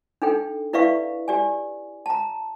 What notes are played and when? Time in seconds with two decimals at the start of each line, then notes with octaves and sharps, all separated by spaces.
0.22 D4 D#4 A4 G5
0.73 E4 B4 D5 E5 F5 C#6
1.28 G4 D5 G#5
2.06 A5 A#5